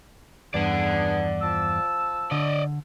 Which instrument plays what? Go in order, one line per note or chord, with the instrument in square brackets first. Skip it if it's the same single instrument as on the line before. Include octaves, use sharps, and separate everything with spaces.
[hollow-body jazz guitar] E2 G2 [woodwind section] B3 D4 G#4 [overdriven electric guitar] D5 F#5
[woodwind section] F3 A5 E6
[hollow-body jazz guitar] D3 [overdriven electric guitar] D5 D#5